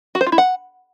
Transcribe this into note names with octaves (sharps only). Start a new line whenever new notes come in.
F#4
C5
F4
E4
F#5